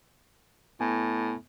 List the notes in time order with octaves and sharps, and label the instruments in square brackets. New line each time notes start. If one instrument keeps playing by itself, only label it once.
[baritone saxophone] A2 [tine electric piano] B3 G#5